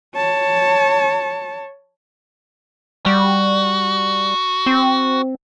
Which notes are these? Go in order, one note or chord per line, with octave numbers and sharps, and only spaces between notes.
C#5 A5
G3 F#4
C4